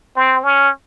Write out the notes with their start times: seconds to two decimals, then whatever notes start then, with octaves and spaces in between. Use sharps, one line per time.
0.16 C4
0.44 C#4